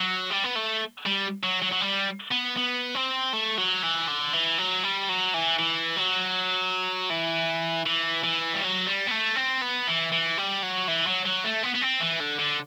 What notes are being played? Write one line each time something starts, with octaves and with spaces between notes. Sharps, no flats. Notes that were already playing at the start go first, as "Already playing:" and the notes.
Already playing: F#3
G3
B3
A3
G3
F#3
F#3
F#3
G3
B3
B3
C4
A3
F#3
E3
D3
E3
F#3
G3
F#3
E3
E3
F#3
E3
E3
E3
G3
F#3
G3
B3
A3
C4
B3
E3
E3
G3
F#3
E3
F#3
F#3
A3
B3
B3
C4
E3
D3
D3